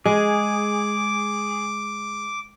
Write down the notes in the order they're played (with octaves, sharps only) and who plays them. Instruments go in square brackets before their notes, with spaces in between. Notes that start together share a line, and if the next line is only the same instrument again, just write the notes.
[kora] G#3 [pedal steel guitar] G#4 [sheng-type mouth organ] D6